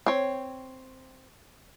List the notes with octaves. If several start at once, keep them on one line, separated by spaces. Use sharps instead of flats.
C4 C#5